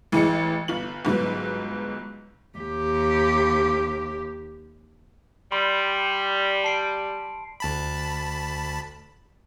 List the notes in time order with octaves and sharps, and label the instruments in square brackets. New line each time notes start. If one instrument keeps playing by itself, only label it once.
[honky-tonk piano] A1 E3 G#3 C#7
G1 F4 F#7
G1 G#2 F#3 B4
[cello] D#2 G4
[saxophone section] G3 [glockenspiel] B5 C6
[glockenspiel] A5 C7 D7
[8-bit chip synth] D2 A5 B5